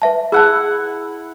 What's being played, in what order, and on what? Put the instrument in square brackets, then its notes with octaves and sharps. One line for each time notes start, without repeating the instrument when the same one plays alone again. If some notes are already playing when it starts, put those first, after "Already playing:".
[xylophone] B4 E5 A5
[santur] E4 F#5 [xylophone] G#4 A5